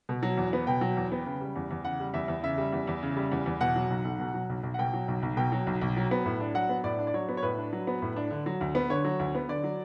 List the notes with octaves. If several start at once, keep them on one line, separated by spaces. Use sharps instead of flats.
B2
F#3
E2
B3
B2 G5
F#3
E2
B3
C#3
G3
E2
E2
C#3 F#5
G3
E2 E5
E2
C#3 E5
G3
E2
E2
C#3
G3
E2
E2
B2 F#5
F#3
B1
B1
B2
F#3
B1
B1
F#5
B2 G5
F#3
B1
B1
B2 G5
F#3
B1
B1
F#3
B3
A2
D4
F#3 F#5
B3
A2 D5
D4
D5
F#3 C#5
B3
C#5
A2 B4
D4
F#3
B3
A2
D4
D3
F#3
D2
B3
D3 C#5
F#3
D2
B3
D3 D5
F#3